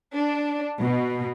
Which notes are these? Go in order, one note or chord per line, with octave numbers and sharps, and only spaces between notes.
D4
B2